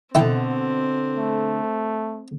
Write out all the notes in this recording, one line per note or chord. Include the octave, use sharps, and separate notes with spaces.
B2 D3 C4 E4 A4 G5
A3